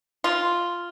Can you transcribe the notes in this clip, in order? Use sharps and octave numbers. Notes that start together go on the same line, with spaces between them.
F4